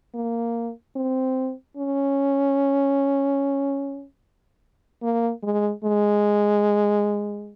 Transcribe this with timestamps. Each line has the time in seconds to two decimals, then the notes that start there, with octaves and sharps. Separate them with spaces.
0.15 A#3
0.96 C4
1.77 C#4
5.03 A#3
5.43 G#3
5.84 G#3